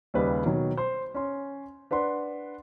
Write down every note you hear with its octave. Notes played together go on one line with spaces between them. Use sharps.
D#2 C#3 G3 B4 D5 D#5
B2 D#3 F#3
C5
C#4 C#5 C6
D4 B4 F#5 C6